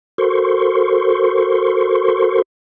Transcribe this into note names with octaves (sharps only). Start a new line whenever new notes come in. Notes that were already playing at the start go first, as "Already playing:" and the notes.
F#4 A4 A#4 C5 C6 C#6